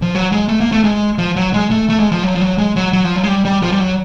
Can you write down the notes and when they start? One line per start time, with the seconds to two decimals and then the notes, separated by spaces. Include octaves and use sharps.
0.02 F3
0.15 F#3
0.32 G#3
0.49 A3
0.61 A#3
0.72 A3
0.84 G#3
1.18 F3
1.36 F#3
1.54 G#3
1.71 A3
1.89 A3
2.00 G#3
2.12 F3
2.23 F#3
2.35 F3
2.41 F#3
2.58 G#3
2.76 F#3
2.93 F#3
3.04 F3
3.16 F#3
3.23 G#3
3.28 G3
3.45 G3
3.63 F3
3.72 G3
3.80 F#3